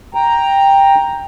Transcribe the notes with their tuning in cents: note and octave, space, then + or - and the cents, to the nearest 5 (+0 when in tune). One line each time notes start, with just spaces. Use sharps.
G5 +10 A#5 +0